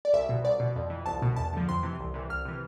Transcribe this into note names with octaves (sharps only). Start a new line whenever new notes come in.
D5
C2 E5
B2
C2 D5
B2
F2
E3
C2 A5
B2
E2 A5
D3 F3
F2 C6
C3 E3
C2
C3 E3
C2 F6
C3 E3